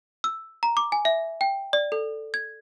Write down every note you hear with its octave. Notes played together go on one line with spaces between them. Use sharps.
E6
A#5
D6
G#5
E5
G5
D5
A4
G#6